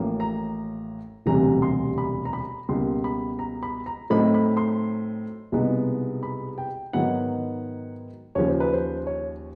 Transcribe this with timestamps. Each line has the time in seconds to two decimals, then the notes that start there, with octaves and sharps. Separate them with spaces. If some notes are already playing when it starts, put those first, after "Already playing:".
Already playing: A1 A2 F3 A#3
0.20 A#5
1.26 E1 D2 C3 E3 G3 A#5
1.62 C6
1.98 B5
2.25 A#5
2.33 B5
2.69 C#2 B2 G3 A#3 C6
3.04 B5
3.39 A#5
3.63 B5
3.86 A#5
4.10 A2 F#3 A3 C4 D#4 B5
4.34 B5
4.57 C6
5.52 C2 B2 G#3 B3 D#4
6.23 B5
6.58 G5
6.93 G#2 D#3 F#3 B3 E4 F#5
8.35 D#2 C#3 F3 C#5
8.48 C5
8.60 B4
8.73 C5
9.07 C#5